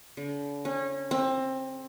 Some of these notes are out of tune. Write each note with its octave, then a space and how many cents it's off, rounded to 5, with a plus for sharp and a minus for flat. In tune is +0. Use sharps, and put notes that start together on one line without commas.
D3 -45
C#4 -25
C4 +20